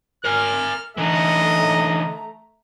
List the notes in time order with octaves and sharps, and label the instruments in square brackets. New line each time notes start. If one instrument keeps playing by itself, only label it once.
[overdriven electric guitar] A#4 G#5 [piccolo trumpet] F6
[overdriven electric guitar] D3 E3 [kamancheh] A3 A#5 [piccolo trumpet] D#5